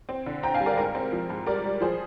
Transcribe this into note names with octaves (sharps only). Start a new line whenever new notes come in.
C4
D3
C4 G5 A#5
F5 G#5
G3
A#4 D5
G#2 A#4
C4
F3
G#2
G3 A#4 D5
G3
F3 G#4 C5